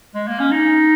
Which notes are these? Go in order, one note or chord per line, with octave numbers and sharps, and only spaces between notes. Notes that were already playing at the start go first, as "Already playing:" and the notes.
G#3
A#3
C#4
D#4